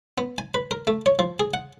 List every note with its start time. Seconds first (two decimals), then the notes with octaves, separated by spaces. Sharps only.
0.18 B3
0.38 G#5
0.54 B4
0.71 A#4
0.87 A3
1.06 C#5
1.19 F3
1.40 G#4
1.54 F#5